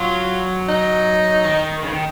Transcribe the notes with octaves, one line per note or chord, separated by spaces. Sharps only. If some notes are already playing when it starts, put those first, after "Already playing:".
Already playing: F#3 F4
D#4
D#3
C#3
D#3